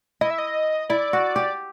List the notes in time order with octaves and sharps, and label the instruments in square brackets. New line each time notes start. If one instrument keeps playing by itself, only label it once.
[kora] E4 [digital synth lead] D#5
[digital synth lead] E5
D#5
[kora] E4 [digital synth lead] D5
[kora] F#4
G4